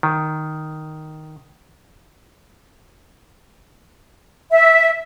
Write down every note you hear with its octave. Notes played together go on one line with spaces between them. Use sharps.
D#3
E5